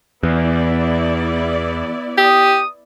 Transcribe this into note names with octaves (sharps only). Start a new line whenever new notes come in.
E2 B3 E4 D5
G4 D#6